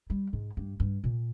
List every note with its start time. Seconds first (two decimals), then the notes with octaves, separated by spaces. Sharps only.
0.10 G3
0.33 G#2
0.57 G2
0.80 G2
1.04 A#2